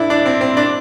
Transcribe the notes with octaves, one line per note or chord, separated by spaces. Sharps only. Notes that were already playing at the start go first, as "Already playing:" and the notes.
Already playing: D4 E4
D4
C4
C4
D4